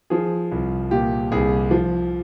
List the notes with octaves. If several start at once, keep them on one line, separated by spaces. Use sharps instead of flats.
F3 G#4
C2
A#2 G4
C2 G#4
F3